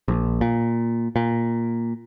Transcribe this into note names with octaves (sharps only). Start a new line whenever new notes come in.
A#1
A#2
A#2